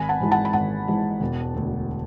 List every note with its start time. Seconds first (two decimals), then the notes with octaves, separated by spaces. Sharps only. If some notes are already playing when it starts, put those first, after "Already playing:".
Already playing: G#1 G#5 B5
0.09 F#5 A5
0.20 G#2 E3 G#3
0.32 F#5 A5
0.45 B5
0.53 G#1 F#5 A5
0.88 G#2 E3 G#3
1.20 E1
1.54 D2 D3